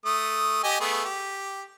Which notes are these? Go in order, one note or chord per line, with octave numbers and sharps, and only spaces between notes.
A3 D#6
G4 D#5 G#5
A3 B3 G#4
G4